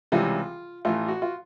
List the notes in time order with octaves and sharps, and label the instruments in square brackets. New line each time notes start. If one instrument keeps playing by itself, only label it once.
[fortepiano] C#2 C3 E3 G3 F4
A1 A2 E3 F4
F#4
F4